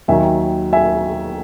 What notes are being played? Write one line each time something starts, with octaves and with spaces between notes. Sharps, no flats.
D#2 D#3 F#3 E5 G#5
E5 G#5